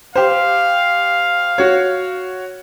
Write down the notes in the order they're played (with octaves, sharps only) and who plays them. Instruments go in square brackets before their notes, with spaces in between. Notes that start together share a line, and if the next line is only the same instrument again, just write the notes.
[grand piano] G4 C5 [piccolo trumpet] F5
[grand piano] F#4 C#5